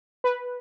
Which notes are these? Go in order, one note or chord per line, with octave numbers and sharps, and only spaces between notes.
B4